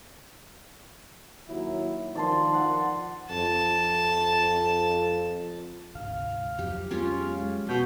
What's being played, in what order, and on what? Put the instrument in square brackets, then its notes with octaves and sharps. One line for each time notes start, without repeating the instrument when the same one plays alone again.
[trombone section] D#2 F#3 E4
[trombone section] D#3 F3 [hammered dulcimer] D5 A5 C6
[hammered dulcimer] F#5
[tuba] F2 [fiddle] A5
[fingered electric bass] D2 G#2 C3 [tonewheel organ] F5
[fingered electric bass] F2 F3 F#3 [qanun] G4
[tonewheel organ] G#3 F5 [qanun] C#4 F4 G4
[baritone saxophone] B2 [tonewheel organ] G6